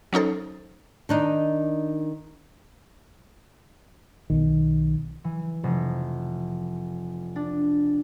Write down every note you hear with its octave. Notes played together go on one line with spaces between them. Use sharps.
F#3 C#4 D#4 A4 C5
D#3 D4 D#4
B1 D#3
E3
F1
D4